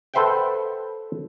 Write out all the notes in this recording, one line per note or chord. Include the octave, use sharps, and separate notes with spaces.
A4 B4 C5 E5 F#5 G5